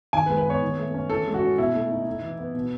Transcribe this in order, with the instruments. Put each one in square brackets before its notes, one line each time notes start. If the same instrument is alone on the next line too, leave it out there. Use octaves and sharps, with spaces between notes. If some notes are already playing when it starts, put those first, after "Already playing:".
[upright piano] D#3 G#5
B4
G#3
B4
B3 C#5
D#3
A3
C#4
E3 A4
G#3
F#4
C#4
B2 E4
A3
D#4
D#4
E3
B3
B2